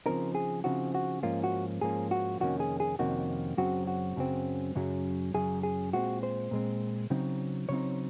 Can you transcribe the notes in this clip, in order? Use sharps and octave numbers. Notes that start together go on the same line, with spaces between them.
C#3 F3 C4 D#4 A#4
G#4
C#3 F3 C4 D#4 F#4
F#4
G#2 F3 A#3 C#4 F4
F#4
G#2 F3 A#3 C#4 G#4
F#4
F2 C3 D#3 A#3 C#4 F#4
G#4
G#4
F2 C3 D#3 A#3 C#4 F#4
F#2 C#3 F#3 C4 F#4
F#4
F#2 C#3 F#3 C4
F#2 C#3 F#3
F#2 C#3 F#3 G#4
G#4
A#2 G#3 C4 F#4
C5
A#2 G#3 C4
C#3 F#3 C4 D#4
C#3 F#3 C4 D#4 C#5